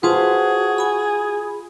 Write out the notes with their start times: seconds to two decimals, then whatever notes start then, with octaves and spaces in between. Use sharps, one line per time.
0.03 F4 F#4 G#4 B4 C5 A5
0.78 G#5 B5